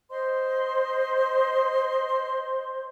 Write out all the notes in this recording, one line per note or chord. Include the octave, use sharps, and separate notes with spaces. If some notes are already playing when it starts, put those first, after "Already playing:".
C5 D#5 C6